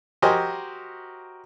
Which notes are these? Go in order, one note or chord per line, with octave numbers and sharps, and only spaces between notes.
F#4 G4 A#4 C5 D#5 G#5